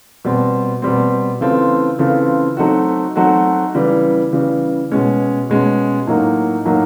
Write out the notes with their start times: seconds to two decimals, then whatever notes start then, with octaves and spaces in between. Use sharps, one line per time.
0.24 B2 G3 C4
0.82 B2 G3 C4
1.41 C#3 E3 A3 C4 F4
1.99 C#3 E3 A3 C4 F4
2.57 F#3 A3 C4 D#4 F#4
3.16 F#3 A3 C4 D#4 F#4
3.75 C#3 E3 G3
4.33 C#3 E3 G3
4.92 B2 G#3 C#4
5.50 B2 G#3 C#4
6.07 A2 F#3 A#3 D#4
6.65 A2 F#3 A#3 D#4